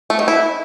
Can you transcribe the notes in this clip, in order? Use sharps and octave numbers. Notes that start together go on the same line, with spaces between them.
A3
D#3
E4